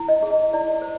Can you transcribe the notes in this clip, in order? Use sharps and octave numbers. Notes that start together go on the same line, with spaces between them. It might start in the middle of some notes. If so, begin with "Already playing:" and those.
Already playing: E4
D#5
G#4
D#5
E4 D5
C5